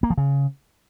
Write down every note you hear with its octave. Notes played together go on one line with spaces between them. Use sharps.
A#3
F3
C#3